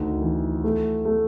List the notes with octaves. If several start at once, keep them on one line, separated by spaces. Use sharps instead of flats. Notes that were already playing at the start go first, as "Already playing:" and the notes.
Already playing: D2 D#3
E3
A3
A3